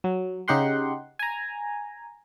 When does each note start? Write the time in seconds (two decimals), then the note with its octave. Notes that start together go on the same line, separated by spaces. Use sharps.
0.04 F#3
0.48 C#3 D#4 G4 F#5 C6
1.19 G#5 A#5